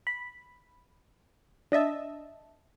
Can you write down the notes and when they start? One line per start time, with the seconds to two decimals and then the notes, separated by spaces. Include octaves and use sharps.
0.07 B5
1.72 D4 D#5 E5 A5